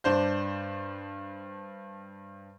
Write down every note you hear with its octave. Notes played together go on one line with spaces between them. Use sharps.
G2 D4 C5 G6